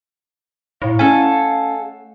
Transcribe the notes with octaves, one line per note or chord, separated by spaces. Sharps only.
A2 E4 F5 C#6
A3 C#4 A4 C#5 F#5 G#5